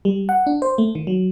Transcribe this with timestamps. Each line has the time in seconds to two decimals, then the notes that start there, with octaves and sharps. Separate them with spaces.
0.05 G3
0.29 F#5
0.47 D4
0.62 C5
0.78 A3
0.95 D#3
1.07 F#3